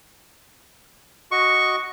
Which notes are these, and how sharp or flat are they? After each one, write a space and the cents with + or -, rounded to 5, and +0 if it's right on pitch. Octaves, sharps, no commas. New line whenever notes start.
F#4 +0 D#5 +0 C#6 +0